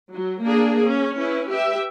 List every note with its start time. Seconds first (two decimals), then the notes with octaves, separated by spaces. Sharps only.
0.11 F#3
0.43 A#3 D4 G#4
0.84 C#4
1.18 C#4 E4 B4
1.49 G4 B4 E5